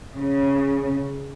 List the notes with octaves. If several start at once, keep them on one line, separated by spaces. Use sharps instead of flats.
C#3